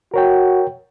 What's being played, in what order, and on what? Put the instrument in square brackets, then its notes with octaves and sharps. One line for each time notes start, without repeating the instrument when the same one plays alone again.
[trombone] F#4 [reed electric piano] A#4 C#5 G5